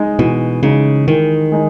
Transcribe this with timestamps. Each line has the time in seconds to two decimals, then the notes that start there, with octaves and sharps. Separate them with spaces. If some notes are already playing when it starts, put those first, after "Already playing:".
Already playing: G#3 D#4
0.19 B2 E3
0.63 C#3 G#3 D#4
1.08 D#3 E3
1.52 G#3 D#4